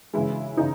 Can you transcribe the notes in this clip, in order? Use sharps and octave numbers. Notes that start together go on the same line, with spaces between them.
C#3 E3 G#3 E4
C#3 E3 D#4